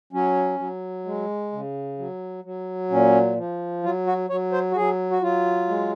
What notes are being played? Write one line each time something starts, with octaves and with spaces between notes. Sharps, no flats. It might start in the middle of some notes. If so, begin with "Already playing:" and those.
F#3 C#4
F#3
G#3
C#3
F#3
F#3
A#2 C#4
F3
F#3 F4
F#4
F#3 C#5
C5
F#4
F#3 G#4
F#4
F#3 F4
G#3